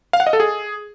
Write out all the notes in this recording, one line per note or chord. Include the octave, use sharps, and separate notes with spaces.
F5
F#5
D#5
A4
G#4